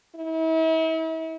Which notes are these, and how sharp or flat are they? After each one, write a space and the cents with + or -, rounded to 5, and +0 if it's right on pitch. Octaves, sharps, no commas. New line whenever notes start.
E4 -40